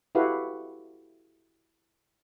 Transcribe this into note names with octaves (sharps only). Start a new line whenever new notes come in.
E4 F#4 G4 A4 B4 F5